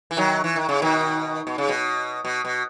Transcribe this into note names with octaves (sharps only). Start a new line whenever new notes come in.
E3
D#3 F#3
E3
D#3
C#3
B2 D#3
B2
C#3
B2
B2
B2